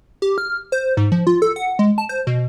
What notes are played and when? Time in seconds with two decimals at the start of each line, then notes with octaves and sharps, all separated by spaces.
0.22 G4
0.38 F6
0.72 C5
0.97 G#2
1.12 F3
1.27 F4
1.42 A4
1.56 F#5
1.79 G#3
1.98 A5
2.09 C5
2.27 B2